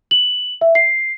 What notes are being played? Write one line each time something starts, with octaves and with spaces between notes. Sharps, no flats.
F#7
E5
C7